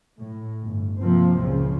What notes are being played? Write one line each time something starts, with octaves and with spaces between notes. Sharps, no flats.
A2
G1
C3 F3 A#3 C4
C#2 A#2 C#3 F3